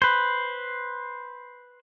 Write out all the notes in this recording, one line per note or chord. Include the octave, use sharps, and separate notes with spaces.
B4 C5